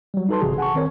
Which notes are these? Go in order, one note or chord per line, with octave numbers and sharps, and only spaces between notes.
F#3 G3
D#4 F#4 A4 B4 A5 C6
G1 C3 E3 F#4 G#4
F#5 G#5 A5 C#6
D#3 C4 A#4 C#5